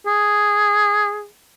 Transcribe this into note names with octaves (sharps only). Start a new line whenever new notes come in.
G#4